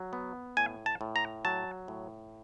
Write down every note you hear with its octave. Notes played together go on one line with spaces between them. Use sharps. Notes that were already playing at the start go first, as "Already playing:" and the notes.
Already playing: F#3
B3
A2 G#5
A5
A2
A#5
F#3 A5
A2